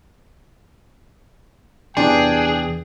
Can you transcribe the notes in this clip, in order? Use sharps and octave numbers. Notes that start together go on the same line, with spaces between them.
E2 C3 E3 D4 G#4 G5